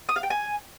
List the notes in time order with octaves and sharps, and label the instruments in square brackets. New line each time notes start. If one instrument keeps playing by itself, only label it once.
[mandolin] D#6
F5
G5
G#5